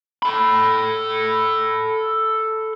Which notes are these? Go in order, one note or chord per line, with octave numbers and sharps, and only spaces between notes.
A4 B5